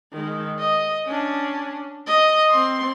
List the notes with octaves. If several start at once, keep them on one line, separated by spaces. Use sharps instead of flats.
D#3 G#3
D#5
C#4 D4
D#5
C4 C6